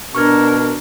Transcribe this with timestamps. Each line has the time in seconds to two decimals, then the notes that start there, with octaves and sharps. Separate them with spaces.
0.15 B2 D4 A#4 C#6 F6 G#6